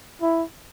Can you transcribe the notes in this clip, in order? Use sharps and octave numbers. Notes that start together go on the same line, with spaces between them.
E4